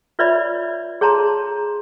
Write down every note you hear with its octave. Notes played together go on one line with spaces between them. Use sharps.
F4 B4 C#5 D5 E5 B5
G#4 C#5 A5 A#5 C6